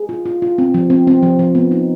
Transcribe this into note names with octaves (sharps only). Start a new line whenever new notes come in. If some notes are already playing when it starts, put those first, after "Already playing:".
Already playing: G#4
F4
F4
F4
C4
F3
C4
C4
F3
F3
B3
D#4